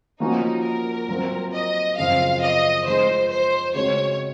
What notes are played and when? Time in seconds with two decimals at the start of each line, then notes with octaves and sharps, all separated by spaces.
0.20 F3 A#3 C#4 D#4 F#4
0.64 A#4
1.08 F#3 C4 F4 C5
1.53 D#5
1.97 F#2 C#3 F3 C4 F5
2.42 D#5
2.86 F3 G#3 D#4 G#4 C5
3.31 C5
3.74 C#3 G#3 C4 F#4 C#5